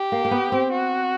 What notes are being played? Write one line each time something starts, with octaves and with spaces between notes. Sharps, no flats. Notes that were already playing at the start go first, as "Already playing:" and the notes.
Already playing: G4
A#3
A#3
B3
C4
F#4